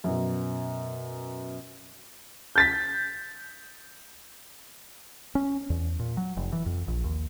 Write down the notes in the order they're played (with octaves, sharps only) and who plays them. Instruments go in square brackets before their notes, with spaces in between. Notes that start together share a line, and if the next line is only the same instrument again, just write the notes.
[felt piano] F#2 B2
[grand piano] G6 A6 B6
[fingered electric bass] C#4
E2
A#2
F#3
F1
E3
F2
A#1
D#2